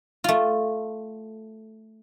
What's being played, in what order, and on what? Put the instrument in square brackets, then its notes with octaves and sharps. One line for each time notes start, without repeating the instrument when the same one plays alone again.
[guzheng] A3 F4